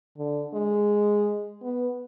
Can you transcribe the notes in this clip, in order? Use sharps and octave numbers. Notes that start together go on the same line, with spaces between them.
D3
G#3
B3